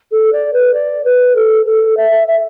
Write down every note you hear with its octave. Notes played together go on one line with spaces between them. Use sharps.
A4
D5
B4
D5
B4
A4
A4
E5
E5